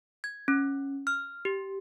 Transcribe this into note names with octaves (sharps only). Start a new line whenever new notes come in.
G#6
C#4
F6
G4